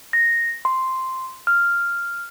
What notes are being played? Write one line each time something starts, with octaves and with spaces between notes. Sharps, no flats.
A#6
C6
F6